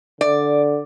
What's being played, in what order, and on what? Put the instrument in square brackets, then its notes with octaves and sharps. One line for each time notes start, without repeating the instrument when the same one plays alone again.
[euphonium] D3 [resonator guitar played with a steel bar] D5